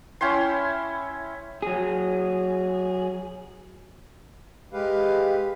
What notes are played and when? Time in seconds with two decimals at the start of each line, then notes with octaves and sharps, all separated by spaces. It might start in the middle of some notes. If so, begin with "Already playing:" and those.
0.21 C#4 E4 G5 C6
1.62 F#3 G#4
4.73 G#3 G4 B4 F5